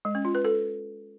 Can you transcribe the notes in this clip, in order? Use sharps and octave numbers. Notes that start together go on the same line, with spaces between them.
G#3
C#4
F4
B4
A4